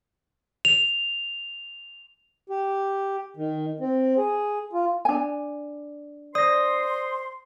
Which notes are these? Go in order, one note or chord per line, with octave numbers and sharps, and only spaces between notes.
F7
G4
D#3
C4
G#4
F4
D4 G#5
C5 D5 C6 D#6 A#6